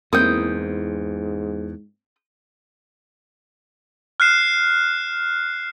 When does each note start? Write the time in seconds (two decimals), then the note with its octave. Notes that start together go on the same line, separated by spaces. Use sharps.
0.13 E2 G#2 A#3 C4 E4 D#6 G6
4.20 F6 F#6 C7 E7